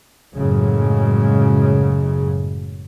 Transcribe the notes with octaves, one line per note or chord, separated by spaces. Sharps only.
F#1 F#2 A2 C#3 F#3 G#3